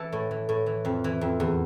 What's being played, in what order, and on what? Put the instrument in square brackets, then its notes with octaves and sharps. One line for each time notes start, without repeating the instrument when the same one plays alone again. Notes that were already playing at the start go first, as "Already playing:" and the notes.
Already playing: [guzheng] E3 A4
A2
E3
A2
E3
F2
E3
F2
E2